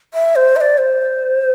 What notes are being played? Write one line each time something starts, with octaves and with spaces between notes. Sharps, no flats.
E5
C5
E5
D5
C5